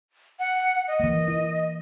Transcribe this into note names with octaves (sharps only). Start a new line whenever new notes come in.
F#5
D#5
E3 A#3
E4